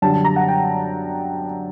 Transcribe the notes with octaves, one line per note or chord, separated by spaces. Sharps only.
F#2 D3 G3 A5
A5
A#5
F#5
G5